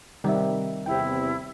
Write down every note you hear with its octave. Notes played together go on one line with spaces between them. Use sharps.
C3 D#3 G3 C4 E5
E2 C3 E4 G5